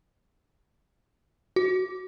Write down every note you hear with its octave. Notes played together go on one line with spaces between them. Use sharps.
F#4